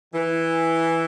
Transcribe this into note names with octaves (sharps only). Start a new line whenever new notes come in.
E3